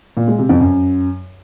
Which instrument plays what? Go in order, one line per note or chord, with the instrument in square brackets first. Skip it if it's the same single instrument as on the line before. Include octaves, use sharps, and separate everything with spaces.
[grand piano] A#2
G#3
C3
F2
F#2